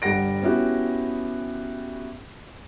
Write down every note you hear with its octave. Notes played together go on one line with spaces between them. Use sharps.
G1 G3 F#5 A#6 D7
B3 C#4 E4 F#4 G4